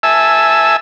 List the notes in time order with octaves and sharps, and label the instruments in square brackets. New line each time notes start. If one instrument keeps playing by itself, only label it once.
[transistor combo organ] E5 G#5 A5 E6